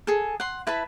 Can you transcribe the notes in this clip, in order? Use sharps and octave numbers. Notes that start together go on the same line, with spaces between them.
G#4 A4
F#5 C6
E4 B4 A5 B5